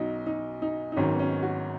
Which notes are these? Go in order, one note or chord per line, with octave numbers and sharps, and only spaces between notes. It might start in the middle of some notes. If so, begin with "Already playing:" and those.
Already playing: B1 B2 F#3 D#4
D#4
D#4
D#4
G#1 G#2 D#3 F#3 C#4
B3
C#4
F#4